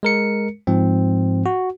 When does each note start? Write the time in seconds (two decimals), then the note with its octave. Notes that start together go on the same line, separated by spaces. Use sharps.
0.03 G#3 A#4 C#7
0.67 G#2 F3 C4
1.46 F#4